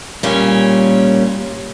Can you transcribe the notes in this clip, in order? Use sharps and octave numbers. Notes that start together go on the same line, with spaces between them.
A#2 G3 C#4